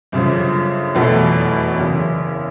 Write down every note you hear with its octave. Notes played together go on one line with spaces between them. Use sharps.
G1 F#2 C#3 F3
F1 E2 B2 F#3 A3
F#1 E2 C#3